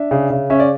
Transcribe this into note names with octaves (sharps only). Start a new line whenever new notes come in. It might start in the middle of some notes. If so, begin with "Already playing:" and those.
Already playing: D4 E5
C#3
C#3
C#4 E5
D5